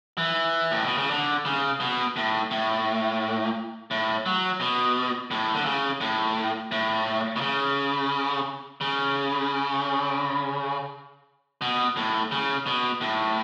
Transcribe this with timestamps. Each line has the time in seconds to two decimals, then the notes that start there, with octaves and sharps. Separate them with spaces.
0.18 E3
0.71 A2
0.84 B2
0.98 C#3
1.10 D3
1.45 C#3
1.80 B2
2.16 A2
2.51 A2
3.91 A2
4.26 F#3
4.61 B2
5.31 A2
5.54 D3
5.65 C#3
6.01 A2
6.72 A2
7.36 B2
7.41 C#3
8.81 C#3
11.61 B2
11.97 A2
12.32 C#3
12.66 B2
13.01 A2